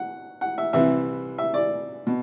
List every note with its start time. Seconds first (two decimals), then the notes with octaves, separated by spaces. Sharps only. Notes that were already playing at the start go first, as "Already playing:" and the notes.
Already playing: F#5
0.41 F#5
0.58 E5
0.73 C2 C3 E3 E5
1.38 E5
1.54 D5
2.07 B2